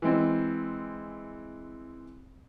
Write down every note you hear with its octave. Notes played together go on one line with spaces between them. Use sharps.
E3 G#3 C4